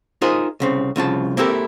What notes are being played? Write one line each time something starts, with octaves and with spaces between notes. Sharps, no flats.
D#4 F4 G#4 A#4 C5 D#5
C2 C#3 C4
C2 C#3 F3 A5
A#3 C4 E4 G4 A4 A#4